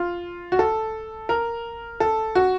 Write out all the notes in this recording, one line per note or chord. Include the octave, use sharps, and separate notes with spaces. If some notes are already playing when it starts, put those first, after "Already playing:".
Already playing: F4
F#4
A4
A#4
A4
F#4